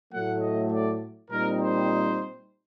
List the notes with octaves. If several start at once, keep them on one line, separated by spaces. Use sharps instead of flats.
A2 F#3 A3 F#5
D#5
D5
A#2 G3 C4 D#4 A#4
C5